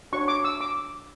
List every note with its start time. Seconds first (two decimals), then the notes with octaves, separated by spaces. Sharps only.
0.12 D4 F#4 C#5 C#6
0.28 D6
0.44 E6
0.61 D6